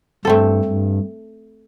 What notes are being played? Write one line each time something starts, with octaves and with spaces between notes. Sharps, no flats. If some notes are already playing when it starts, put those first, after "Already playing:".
G2 A3 C4 A4
G2